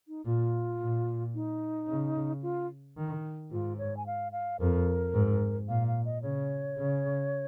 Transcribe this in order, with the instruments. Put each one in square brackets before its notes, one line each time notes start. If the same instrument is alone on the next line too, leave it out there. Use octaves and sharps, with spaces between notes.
[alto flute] D#4
[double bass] A#2 [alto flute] F4
[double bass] A#2
[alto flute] D#4
[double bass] C#3
[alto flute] F4
[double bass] D#3
[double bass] G#2 [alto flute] F4
[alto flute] C#5
G#5
F5
F5
[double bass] F2 [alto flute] A#4
[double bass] G#2
[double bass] A#2 [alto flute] F5
[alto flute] F5
D#5
[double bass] C#3 [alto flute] C#5
[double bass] C#3